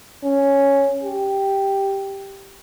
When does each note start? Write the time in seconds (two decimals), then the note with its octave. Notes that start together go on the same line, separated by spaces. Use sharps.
0.24 C#4
1.03 G4